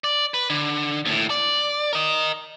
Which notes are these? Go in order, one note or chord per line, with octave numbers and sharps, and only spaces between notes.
D5
B4
D3
D#2 A2
D5
A#4 D#5